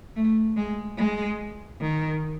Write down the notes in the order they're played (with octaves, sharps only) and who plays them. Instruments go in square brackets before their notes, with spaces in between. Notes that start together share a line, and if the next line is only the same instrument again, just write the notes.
[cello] A3
G#3
G#3
D#3